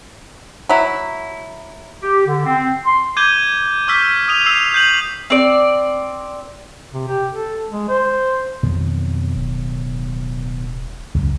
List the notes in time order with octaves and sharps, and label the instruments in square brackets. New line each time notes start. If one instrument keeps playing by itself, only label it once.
[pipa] F#3 E4
[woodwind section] G4
D3
C4
C6
[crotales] D6 G6 G#6 D#7 G7
C#6 D6 E6 F6 G6 B6
D#6 D#7 F7
E6 C7 F7
G6 C7 D#7 F#7
[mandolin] C4 D5
[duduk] C3
G4
A4
G#3
C5
[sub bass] F2 [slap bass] B2 D#3 F#3
[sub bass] D1
[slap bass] C#2 F#2